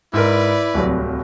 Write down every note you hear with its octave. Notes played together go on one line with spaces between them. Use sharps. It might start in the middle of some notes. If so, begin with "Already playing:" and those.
G#2 E4 A#4 B4 D5
D1 C2 F#3